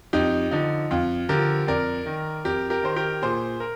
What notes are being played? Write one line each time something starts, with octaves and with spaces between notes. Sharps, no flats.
F2 D#4 G4
D3 F3 D#4
F2 F4
D3 F3 G4 A#4
F2 A#4 D5
D#3
F2 G4 A#4
G4 A#4
D#3 C5
G4 A#4
A#2 G#4 C5
A#4